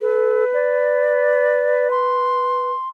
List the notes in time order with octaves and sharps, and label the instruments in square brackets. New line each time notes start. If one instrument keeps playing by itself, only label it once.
[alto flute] A4 [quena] B4
[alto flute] D5
C6